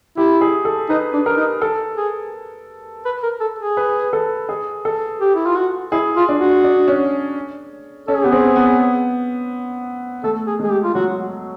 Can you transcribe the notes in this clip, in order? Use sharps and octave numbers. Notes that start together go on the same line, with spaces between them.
E4 G4
G#4
A4
D#4 B4
D4
A#4
D#4
A4
G#4
B4
A#4
A4
G#4
B4
A4
G#4
A4
G4
E4
F4
F#4
E4 G#4
F4
D4
F#4
D4
C#4
C#4 A4
G#4
B3 G4
C4 G#4
B3
A3 A4
G#4
G#3 G#4
G4
F4
F#3 F#4